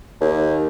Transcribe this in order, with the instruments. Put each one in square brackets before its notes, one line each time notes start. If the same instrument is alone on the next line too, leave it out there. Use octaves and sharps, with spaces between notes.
[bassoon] D#2